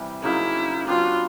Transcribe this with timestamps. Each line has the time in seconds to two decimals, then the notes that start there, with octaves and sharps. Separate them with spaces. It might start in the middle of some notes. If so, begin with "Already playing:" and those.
Already playing: C3 E3 G3
0.23 C#3 F#3 A#3 D#4 E4
0.87 F#3 B3 D4 F4 G4